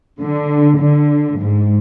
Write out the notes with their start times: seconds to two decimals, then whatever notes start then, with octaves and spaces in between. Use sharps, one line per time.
0.19 D3
0.78 D3
1.38 G#2